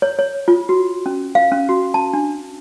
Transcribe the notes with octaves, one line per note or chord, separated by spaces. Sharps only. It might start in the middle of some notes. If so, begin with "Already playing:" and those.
C#5
C#5
F4
F#4
C#4
F5
C#4
F#4
A5
D4